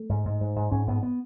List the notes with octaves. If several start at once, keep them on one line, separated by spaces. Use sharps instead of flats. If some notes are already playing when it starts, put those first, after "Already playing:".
Already playing: A3
G#2
G#2
G#2
G#2
G#2 C#4
G#2 B3
B3